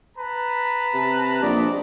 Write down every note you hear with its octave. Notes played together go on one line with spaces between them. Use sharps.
B4 A5 A#5
C3
A#1 D#4 D5